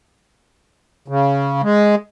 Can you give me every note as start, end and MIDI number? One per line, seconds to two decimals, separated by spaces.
1.08 1.62 49
1.62 1.95 56